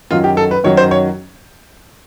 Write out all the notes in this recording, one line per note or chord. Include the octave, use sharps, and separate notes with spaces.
F#2 D#3 F#3 F4
G4
A4
B4
F#2 D#3 F#3 C#5
C5
C#5